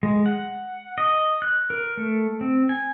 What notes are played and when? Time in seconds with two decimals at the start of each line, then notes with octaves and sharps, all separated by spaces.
0.03 G#3
0.26 F#5
0.98 D#5
1.42 F#6
1.70 A#4
1.97 A3
2.41 C4
2.69 G#5